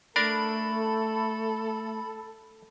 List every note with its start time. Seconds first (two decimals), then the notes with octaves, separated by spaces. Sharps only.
0.16 A3 D4 A4 A#4 D5 B5